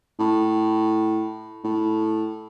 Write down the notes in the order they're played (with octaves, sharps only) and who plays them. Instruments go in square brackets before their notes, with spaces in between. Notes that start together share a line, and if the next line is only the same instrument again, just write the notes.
[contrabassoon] A2
A2